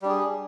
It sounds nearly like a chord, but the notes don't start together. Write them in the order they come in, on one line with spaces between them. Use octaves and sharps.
G3 D4 G#4